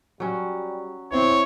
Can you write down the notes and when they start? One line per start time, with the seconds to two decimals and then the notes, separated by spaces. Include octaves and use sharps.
0.20 F#3 G3 C#4
1.12 C4 E4 C#5